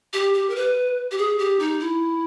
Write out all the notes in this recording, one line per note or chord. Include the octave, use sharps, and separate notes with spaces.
G4
G4
A#4
B4
G4
G#4
G4
D#4
E4